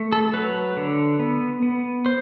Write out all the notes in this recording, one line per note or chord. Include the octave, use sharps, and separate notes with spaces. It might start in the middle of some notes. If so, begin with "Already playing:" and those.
Already playing: A3
A4
F#3 B4
D3
B3
B3
C5